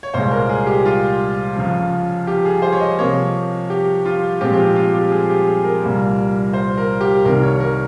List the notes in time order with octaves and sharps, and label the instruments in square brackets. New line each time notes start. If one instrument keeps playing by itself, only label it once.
[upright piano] C#5
C2 A#2 G#3 C5
A#4
G#4
G4
F4
C#2 C#3 F3
G4
G#4
C5
C#5
D#5
C3 F3 A#3 C#5
G4
F4
A#2 F3 G#3 C4 G4
G4
F4
F4
G4
G#4
G4
G#4
A#4
C2 A#2 G3
C5
A#4
G4
C2 C3 D#3 A#4
C#5
A#4